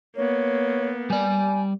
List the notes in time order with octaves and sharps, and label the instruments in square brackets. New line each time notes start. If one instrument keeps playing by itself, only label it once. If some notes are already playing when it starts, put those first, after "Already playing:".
[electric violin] A#3 B3 [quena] C#5
[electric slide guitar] G3 D5 [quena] G#5